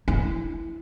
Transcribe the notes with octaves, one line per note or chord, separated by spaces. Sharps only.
E4